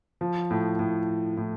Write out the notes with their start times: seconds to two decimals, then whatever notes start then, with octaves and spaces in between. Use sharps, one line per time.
0.21 F3
0.51 A2
0.79 A2
1.37 A2